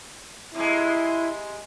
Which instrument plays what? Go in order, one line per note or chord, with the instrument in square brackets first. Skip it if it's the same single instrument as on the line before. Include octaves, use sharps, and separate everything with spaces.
[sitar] C3 G#3 [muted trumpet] E4